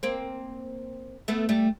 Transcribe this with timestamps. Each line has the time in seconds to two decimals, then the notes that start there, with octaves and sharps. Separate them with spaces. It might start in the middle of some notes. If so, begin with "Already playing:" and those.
0.03 A#3 C4
1.28 A3 B3
1.49 G3 A3